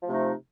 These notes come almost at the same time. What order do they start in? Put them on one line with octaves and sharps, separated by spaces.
F3 A3 C3 D#4